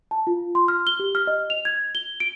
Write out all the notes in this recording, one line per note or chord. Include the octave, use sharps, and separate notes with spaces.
A5
F4
C6
F6
G7
G4
F6
D#5
F7
G#6
G7
D7